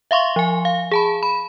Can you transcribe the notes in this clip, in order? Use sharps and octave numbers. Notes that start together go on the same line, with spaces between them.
E5 F5 C6 C#6
F3 G#5
F5
G#4 A5 B5
B5